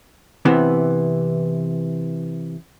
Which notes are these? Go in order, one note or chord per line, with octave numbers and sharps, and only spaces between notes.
C3 E3 B3